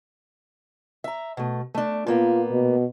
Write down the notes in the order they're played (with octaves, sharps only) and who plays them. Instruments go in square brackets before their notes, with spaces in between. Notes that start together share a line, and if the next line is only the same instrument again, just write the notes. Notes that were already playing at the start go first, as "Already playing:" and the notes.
[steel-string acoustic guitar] E5 A#5
B2 A3
A3 D4
[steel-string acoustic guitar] A#2 A#3 B3 [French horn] F4
[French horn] B2